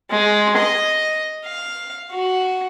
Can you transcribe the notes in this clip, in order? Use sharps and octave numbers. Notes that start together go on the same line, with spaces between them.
G#3
D#5
F5
F#4